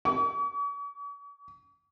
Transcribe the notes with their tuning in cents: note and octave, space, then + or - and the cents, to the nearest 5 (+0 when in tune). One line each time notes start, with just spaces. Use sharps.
C#6 +45